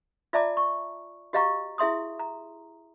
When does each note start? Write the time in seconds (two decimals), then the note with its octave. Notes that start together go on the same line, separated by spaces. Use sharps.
0.33 F4 D5 E5 A5 A#5 D6
0.57 C#6
1.33 F#4 G4 D#5 F5 A#5 C#6
1.78 E4 G#4 E5 C6 D#6
2.19 A#5